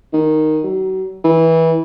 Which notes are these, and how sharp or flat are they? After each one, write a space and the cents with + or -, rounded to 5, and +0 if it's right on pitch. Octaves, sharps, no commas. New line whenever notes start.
D#3 -5
F#3 +35
E3 -20